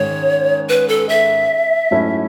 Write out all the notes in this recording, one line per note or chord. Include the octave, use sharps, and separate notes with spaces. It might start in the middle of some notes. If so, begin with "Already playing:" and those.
Already playing: G#2 D#3 G#3 C#4 C#5
B4
A4
E5
G#2 F#3 A3 C#4 E4